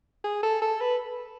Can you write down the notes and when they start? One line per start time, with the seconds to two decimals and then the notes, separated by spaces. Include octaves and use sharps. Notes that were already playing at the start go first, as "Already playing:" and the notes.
0.24 G#4
0.43 A4
0.61 A4
0.81 B4